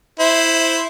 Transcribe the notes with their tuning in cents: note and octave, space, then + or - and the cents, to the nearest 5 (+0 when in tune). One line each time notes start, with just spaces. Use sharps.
E4 +0 C5 +0